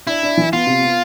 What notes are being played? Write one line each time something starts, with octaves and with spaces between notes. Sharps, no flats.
D4 E4
D4
E3
B3 F4
C3
B3